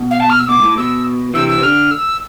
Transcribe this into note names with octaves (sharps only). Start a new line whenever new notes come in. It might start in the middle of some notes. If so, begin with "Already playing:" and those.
Already playing: B2
F5
A5
F6
E6
B2 D6
G#2
A2
B2 E6
C3 E3 E6
E6
C3
D3 F6
E6